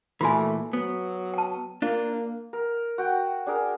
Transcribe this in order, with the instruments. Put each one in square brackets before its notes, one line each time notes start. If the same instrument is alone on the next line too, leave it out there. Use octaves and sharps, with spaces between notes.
[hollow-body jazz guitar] A#2 E3 [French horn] A3 [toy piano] F4 F#4 G#5
[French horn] F#3 [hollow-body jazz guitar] B3
[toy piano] G5 A5
[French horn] A#3 [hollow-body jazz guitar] D4 F4
[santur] A#4
F#4 G5
D4 G#4 A#4